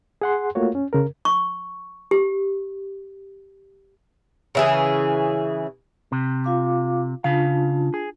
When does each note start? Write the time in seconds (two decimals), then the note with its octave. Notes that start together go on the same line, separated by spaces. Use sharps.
0.22 G#4 F#5 C6
0.55 A3 A#3 F4 F#4 C#5
0.75 C#4
0.93 C#3 A#4
1.25 C#6
2.11 G4
4.55 C#3 E3 G#4
6.12 C3
6.44 F4 F5 D6
7.24 C#3 D4 F4 F5 A5
7.94 G#4